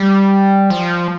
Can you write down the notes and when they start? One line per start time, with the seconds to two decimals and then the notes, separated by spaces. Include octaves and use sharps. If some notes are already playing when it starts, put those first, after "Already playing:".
Already playing: G3
0.70 F3